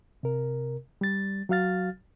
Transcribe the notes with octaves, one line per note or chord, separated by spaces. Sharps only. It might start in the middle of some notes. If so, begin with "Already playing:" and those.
C3 A#4
G3 A6
F#3 F#4 F5 F6 A6